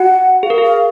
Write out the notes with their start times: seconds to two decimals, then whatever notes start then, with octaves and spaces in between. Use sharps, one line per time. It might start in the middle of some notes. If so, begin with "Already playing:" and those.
Already playing: F#4 F#5
0.43 G#4 F5
0.50 A#4
0.58 G#4 F5